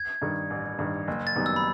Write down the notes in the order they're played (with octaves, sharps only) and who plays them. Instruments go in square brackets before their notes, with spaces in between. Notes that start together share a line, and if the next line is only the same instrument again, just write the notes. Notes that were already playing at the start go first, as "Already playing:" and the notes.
Already playing: [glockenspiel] G#6
[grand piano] G2 D#3
A1
G2 D#3
F#1
[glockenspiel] A6
[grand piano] F#2 D#3 G3 B3
[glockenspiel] E6
B5